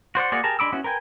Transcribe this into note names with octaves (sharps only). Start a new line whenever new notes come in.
F#4 C5 D5 F#5
A#3 F#4 G#4 D5 F#5
G4 G#4 A#4 A5 A#5
G#3 D4 B5 D6 E6
B3 C#4 E4 F#4
A#4 B4 G5 G#5